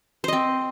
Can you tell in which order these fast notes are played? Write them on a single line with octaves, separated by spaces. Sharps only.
C5 D#5 C4